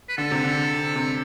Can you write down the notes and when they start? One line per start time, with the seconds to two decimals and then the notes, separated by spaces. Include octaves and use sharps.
0.09 B4
0.17 D3 A4
0.31 C3
0.44 D3
0.95 C3